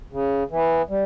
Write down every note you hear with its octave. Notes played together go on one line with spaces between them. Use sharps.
C#3
E3 B3
G3